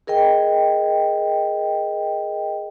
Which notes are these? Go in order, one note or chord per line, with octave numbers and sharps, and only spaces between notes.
G#4 A#4 D#5 G5